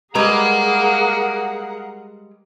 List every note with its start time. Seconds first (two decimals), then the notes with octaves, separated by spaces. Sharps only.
0.15 G3 G#3 G#4 A#4 B4 F5 F#5 A#5